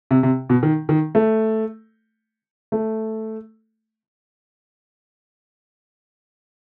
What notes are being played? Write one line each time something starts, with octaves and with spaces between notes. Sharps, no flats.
C3
C3
B2
D#3
D#3
A3
A3